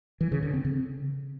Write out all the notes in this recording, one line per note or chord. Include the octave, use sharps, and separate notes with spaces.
E3
C#3
D3
C4
C#3